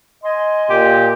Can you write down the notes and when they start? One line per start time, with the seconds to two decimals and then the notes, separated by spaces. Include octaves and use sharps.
0.24 D#5 G#5 C6
0.70 A#2 G4